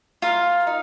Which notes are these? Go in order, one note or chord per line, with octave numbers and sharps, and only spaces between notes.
F4 A#4 F5
D#4